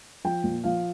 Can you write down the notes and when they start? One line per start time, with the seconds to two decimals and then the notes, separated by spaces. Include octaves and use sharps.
0.24 F3 G5
0.44 A#2
0.64 F3 F5